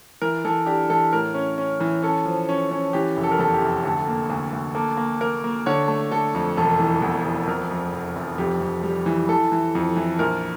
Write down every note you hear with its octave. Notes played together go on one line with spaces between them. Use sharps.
E3 A#4
E3 A4
D4 G4
E3 A4
A2 A#4
C#4
C#4
E3
C#4 A4
F3
C#4
C#4
E3 G4
F1
A4
A#4
E2 A4
G4
F1
D2 A4
A#3
D2
D2
A#3 A4
A#3
A#3 A#4
A#3
D3 C#5
A3
D3 A4
F2
E1 A4
E3
E2
E2
F2 A#4
F2
F1
F1
F2 G4
F2
G3
E3
E3 A4
E3
F2
E3
A#1 A#4